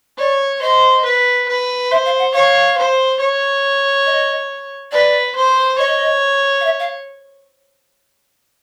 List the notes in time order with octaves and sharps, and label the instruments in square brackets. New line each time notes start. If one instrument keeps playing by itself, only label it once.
[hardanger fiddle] C#5 [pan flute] D5
[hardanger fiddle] C5 [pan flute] D#5
[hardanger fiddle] B4
B4
[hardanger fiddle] C5 [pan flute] E5
[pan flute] F5
F#5
[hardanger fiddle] C#5 [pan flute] F5
[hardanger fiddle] C5
C#5
[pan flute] D#5
[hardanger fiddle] B4 [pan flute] D5
[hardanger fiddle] C5
[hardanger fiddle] C#5 [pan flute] D#5
[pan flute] F5
E5
F5